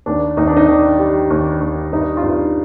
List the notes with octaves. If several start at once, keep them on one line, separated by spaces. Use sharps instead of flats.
D#2 D4
D#2 D#4
D4
D#4
D#3 D4
G3
D#2
D#2
G2 D#4
F4
G2 D#4